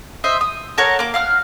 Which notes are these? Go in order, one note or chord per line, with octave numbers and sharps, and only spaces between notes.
C5 D#5 E5
D#6
A4 A#4 C#5 F#5
A#3 D6
F5 F#5 F6